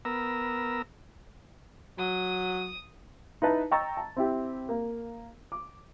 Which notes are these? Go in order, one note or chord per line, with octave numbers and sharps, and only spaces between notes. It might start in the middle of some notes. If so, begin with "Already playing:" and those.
B3 A#4 A#5 E6
F#3 D#6
D#4 E4 B4 A5
D#5 G5 A#5 C#6 E6 A6
A5
C4 E4 G4
A#3
D6